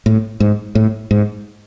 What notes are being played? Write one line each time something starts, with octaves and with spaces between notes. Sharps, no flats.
A2
G#2
A2
G#2